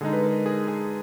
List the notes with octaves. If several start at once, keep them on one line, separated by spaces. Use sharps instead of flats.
D3 G#3 D#4 G#4
B4
A#4
G#4
G#4